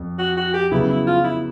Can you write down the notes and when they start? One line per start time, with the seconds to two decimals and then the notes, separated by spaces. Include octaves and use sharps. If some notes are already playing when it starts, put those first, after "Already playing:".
Already playing: F2
0.19 F#4
0.37 F#4
0.54 G4
0.71 C#3 F#3 B3 E4
0.89 E4
1.07 F4
1.24 E4